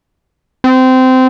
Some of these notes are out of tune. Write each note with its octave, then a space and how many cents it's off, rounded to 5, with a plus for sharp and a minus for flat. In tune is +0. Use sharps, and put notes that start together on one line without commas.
C4 -20